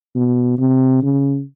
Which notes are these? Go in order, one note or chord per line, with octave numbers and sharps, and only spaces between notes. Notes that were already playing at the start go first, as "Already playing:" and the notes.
B2
C3
C#3